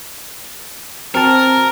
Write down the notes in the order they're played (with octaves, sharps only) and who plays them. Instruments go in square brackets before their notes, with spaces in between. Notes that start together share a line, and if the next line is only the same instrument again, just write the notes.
[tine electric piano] C4 F#4 A5 [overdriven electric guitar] A#4